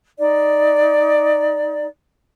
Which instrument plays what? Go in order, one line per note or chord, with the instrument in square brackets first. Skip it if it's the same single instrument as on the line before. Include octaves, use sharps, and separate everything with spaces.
[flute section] D#4 D5